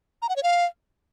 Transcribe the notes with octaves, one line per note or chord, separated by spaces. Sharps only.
A#5
F#5
C#5
F5